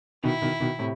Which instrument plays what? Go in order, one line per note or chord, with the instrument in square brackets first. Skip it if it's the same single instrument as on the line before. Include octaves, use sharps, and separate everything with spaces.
[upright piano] B2 D#3 [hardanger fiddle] E4
[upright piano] B2 D#3
B2 D#3
A2 C3